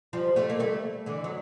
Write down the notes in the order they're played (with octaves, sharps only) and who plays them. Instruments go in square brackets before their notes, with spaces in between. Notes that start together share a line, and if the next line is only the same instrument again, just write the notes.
[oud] F3 G3
G3 A3
A#3
G3 A3
D3 E3
F#3